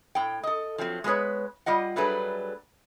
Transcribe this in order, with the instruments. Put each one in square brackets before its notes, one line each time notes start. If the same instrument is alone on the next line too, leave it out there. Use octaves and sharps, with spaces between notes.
[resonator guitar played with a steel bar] A2 G5
A4 D#5
F3 F#3 A3 C4
G#3 B3 F#4 B4 C#5
G3 F4 D#5 F#5
F#3 G3 A3 D4 G#4 B4